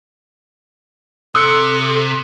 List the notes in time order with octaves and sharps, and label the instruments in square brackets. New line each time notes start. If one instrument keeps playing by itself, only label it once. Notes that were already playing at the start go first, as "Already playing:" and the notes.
[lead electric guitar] C3 [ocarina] A4 [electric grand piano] D#6 F#6 C#7 [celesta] E6